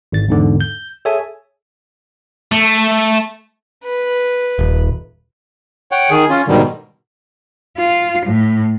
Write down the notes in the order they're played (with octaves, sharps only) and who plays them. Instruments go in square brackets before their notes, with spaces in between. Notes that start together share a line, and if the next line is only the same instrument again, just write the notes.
[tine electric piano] G#1 A6
E2 G#2 D3
G6
G#4 A4 C#5 E5 G#5
[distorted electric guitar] A3
[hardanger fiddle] B4
[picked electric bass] D#1
[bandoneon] C#5 F#5 G5
D#3 G#4
C#4 F4
G#2 B2 D3 D#3 G3
[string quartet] F4
A2